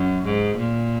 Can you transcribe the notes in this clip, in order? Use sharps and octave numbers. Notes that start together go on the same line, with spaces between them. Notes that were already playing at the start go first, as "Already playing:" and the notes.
Already playing: F#2
G#2
A#2